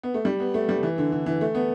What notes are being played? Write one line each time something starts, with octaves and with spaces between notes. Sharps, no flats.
B3
A3
G3
B3
A3
G3
E3
D3
D3
E3
A3
B3